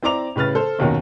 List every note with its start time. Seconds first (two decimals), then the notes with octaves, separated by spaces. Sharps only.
0.03 C4 E4 D5 A#5 D6 F7
0.36 A2 C#3 B4 F6 A6
0.55 A4 C5
0.79 F#1 D#2 B2 D#3 C#4 A#4